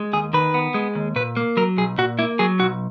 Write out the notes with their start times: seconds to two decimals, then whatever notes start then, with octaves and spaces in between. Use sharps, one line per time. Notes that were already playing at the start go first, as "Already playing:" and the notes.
Already playing: G#3
0.13 D#2 G#4
0.33 D#3 B4
0.54 B3
0.74 G#3
0.95 D#2
1.16 A#2 B4
1.37 A#3
1.57 F#3 A#4
1.77 B1 G#4
1.98 A#2 F#4
2.19 A#3 E4
2.39 F#3 G#4
2.60 B1 F#4